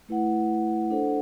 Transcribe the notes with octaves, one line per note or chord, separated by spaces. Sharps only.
A3 E4 B4 F#5
D4 A4 C5 F#5